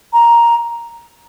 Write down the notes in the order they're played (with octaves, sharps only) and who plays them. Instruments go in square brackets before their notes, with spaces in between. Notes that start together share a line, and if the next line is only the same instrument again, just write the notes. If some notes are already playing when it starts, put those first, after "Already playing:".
[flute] A#5